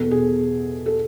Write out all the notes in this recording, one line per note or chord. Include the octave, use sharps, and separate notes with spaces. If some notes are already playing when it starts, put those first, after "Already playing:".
Already playing: E2 B2 A4
G#4
A4